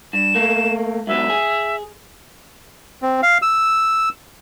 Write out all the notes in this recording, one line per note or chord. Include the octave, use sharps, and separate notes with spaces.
G2 E7
A3 A#3
G#2 F#3 B3 E5
G#4
C4
F5
E6